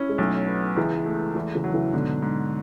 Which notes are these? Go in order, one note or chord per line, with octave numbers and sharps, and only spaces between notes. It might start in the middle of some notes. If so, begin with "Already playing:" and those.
Already playing: C#4 E4
G#3
B1 F#3 A3
B3
C#2 E3 G#3
A3
E2 E3 G#3
C#3 E3
F#3
C#3 E3
G#2 B2 D3
G#2